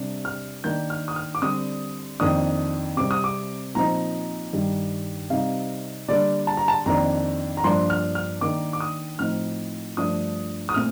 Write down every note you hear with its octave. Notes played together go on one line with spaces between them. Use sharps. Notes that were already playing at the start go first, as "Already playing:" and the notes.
Already playing: C3 G3 D4
F6
D#3 A#3 D4 G6
F6
D#6
F6
D6
D3 G3 C4 D#6
F2 D#3 A#3 D4 D#6
C3 G3 C4 D6
D#6
D6
A#2 F3 C4 D#4 A#5
G2 D#3 G3
C3 G3 C4 D#4 F5
D3 G3 A#3 D4 D5
A5
A#5
A5
F2 D#3 A#3 D4 A#5
A#5
G2 F3 A#3 D4 C6
F6
F6
D#3 A#3 D4 D6
D6
D#6
A2 F3 C4 D#4 F6
G2 F3 A3 D4 D#6
D#6
A#2 A3 C4 F6